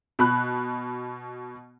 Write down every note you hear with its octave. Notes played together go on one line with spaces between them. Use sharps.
B2 B5 F#6